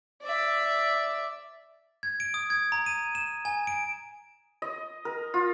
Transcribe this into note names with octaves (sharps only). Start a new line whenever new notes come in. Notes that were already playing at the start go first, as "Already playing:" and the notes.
D5 E5
G#6
D7
D#6
G#6
A#5
D#7
E7
G#5
D7
D#5
A#4
F4